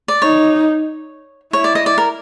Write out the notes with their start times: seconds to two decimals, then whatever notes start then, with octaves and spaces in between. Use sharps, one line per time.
0.08 D5
0.22 D#4 C#5
1.53 E4 C#5
1.64 D5
1.75 D#5
1.86 D5
1.98 A#4